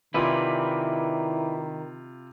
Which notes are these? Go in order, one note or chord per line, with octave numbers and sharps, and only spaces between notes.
C3 D#3 E4 F4 B4 D5 B5